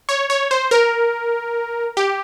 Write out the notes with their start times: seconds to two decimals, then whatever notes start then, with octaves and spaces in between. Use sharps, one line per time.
0.09 C#5
0.30 C#5
0.51 C5
0.71 A#4
1.97 G4